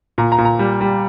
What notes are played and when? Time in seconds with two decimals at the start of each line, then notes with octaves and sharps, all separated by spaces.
0.18 A#2 A#5
0.32 A#5
0.38 A#2
0.45 A#5
0.59 G3
0.81 G3